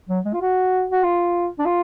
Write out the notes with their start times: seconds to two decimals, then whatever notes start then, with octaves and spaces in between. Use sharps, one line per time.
0.09 F#3
0.25 G#3
0.33 F4
0.41 F#4
0.91 F#4
1.04 F4
1.59 D4
1.65 F4